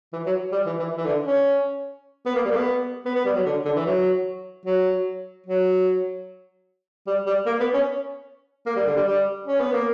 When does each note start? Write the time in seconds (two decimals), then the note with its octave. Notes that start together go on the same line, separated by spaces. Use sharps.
0.13 E3
0.26 F#3
0.52 G3
0.66 E3
0.80 E3
0.97 E3
1.05 D3
1.26 C#4
2.26 B3
2.35 A#3
2.45 G3
2.51 A#3
2.56 B3
3.05 B3
3.15 B3
3.26 G3
3.36 F#3
3.46 D3
3.65 D3
3.76 E3
3.86 F#3
4.66 F#3
5.46 F#3
7.07 G3
7.27 G3
7.46 A#3
7.60 B3
7.74 C#4
8.66 A#3
8.76 G3
8.87 D3
8.97 G3
9.07 G3
9.47 C#4
9.61 B3
9.73 A#3